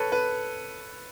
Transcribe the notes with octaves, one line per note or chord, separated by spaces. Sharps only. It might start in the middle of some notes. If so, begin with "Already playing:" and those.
Already playing: A4 B4 C#5
B4